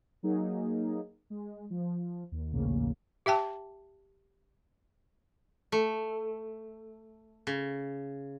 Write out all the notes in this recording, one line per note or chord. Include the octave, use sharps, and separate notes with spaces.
F#3 A#3 D#4 G#4
G#3
F3
D#2
A#1 D#2 A2 C#3 A#3
G4 E5 G5 A5
A3
C#3